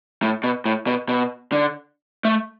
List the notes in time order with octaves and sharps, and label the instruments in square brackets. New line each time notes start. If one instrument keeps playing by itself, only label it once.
[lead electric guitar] A2
B2
A2
B2
B2
D3
A3